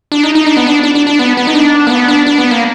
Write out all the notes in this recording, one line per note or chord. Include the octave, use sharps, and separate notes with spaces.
D4
D#4
D#4
D4
B3
D4
D4
D4
D4
B3
B3
D#4
D4
A#3
B3
D4
D4
B3
A#3